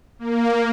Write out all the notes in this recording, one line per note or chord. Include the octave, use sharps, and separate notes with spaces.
A#3